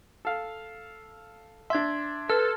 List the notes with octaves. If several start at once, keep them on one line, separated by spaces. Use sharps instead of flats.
A4 F5
D4 E5 C6 G#6
A4 B4 F6